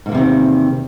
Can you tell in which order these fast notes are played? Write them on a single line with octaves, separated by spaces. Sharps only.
G#2 A#3 E2 C3 D#3